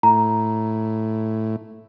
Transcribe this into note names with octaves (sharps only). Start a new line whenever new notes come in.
A2 A#5